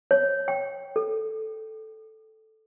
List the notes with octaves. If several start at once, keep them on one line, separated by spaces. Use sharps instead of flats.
C#5
G5
A4